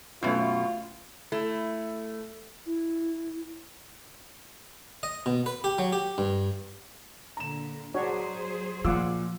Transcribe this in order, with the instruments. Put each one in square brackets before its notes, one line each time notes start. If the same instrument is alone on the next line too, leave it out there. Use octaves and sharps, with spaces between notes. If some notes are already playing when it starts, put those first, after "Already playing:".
[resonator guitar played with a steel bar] F#2 B2 [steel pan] A3 C#4 E4 [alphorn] F4
[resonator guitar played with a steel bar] A3 E4
[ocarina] E4
[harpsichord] D#5
B2
B4
G4
F#3
G4
G2
[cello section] A#2 D3 [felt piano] A#5 E7
[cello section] F#3 G#4 C5 [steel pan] D4 F#4 C#5
[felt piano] A#2 D6 E6 [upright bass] F3 [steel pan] F4 F#5